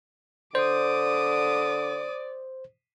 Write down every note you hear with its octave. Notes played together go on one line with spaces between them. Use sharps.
D3 C5 D5 D6 D#6